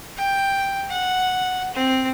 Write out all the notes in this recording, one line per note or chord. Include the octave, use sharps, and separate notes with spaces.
G5
F#5
C4